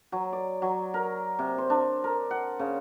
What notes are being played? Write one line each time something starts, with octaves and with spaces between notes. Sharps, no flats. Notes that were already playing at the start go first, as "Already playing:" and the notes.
F#3
D5
F#3
A#4
C3
C5
D4
A#4
F#5
C#3